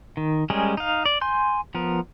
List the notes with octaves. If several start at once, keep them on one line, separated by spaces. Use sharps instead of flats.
D#3
G3 G#3 C#4 G#4 A#4
D#4 F5
D5
G#5 C6 G6
F3 B3 A#4